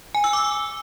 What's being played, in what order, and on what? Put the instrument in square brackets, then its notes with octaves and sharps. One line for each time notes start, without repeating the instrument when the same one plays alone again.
[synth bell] G#5
E6
D6